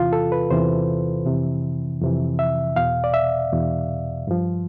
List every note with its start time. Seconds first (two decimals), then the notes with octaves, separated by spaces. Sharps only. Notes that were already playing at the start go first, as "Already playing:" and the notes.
Already playing: E2 C3 E3 F4
0.13 A4
0.32 B4
0.51 E2 C3 E3 C5
1.26 F2 C3 E3
2.01 F2 C3 E3
2.39 E5
2.76 E2 B2 F5
3.04 D5
3.14 E5
3.52 E2 B2
4.27 G2 F3